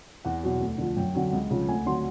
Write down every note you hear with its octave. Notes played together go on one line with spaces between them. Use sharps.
E2 F#5
B2 F#3
D2
D3 F3
F#2 G5
D3 F#3
C#2
C#3 F3
D2 G#5
D3 F#3 C6